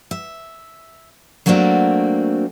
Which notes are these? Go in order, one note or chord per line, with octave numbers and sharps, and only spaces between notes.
E5
F#3 A3 A#3 C4 D4 F#4